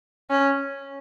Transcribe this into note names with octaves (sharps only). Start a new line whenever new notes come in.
C#4